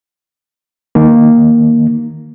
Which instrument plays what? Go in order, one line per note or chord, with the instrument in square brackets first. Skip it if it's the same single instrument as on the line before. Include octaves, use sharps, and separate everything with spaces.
[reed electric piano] D#3 A#3